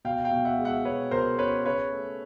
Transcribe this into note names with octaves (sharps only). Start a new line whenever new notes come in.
B2 F5 G5
F5 G5
B2
E5 F#5
G#3
E5 F#5
B2 B4 C#5
B2 A#4 C5
C#4 B4 C#5
C#3 B4 C#5
A3